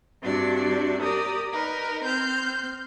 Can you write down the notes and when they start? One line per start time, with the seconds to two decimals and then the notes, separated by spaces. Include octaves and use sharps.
0.23 G2 C3 D4 F#4 D5
1.02 G4 A#4 D5 D#6
1.53 D#4 A#4 B4
2.05 C4 C5 F6 G6